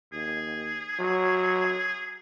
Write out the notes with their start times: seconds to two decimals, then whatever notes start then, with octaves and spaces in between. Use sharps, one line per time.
0.13 D#2 G#4
0.99 F#3